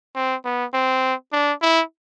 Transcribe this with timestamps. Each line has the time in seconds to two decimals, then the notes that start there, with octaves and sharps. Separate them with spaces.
0.15 C4
0.45 B3
0.74 C4
1.33 D4
1.62 E4